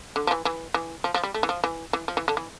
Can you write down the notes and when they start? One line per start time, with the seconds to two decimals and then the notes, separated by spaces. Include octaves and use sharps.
0.16 D3
0.27 F3
0.31 E3
0.45 E3
0.74 E3
1.04 F3
1.14 F3
1.23 G3
1.34 A3
1.43 E3
1.49 F3
1.64 E3
1.93 E3
2.08 F3
2.17 E3
2.28 D3
2.37 E3